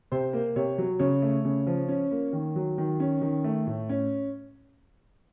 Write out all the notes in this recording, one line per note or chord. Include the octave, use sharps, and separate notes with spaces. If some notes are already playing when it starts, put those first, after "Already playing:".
C3 C5
A#3
C3 C#5
F#3
C#3 C#5
A3
C#3
F3
C#4
A#3
D#3
F#3
D#3
C#4
D#3
A3
A2
C#4